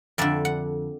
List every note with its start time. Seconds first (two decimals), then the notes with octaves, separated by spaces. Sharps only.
0.18 F2 D3 D5 E5
0.45 F#5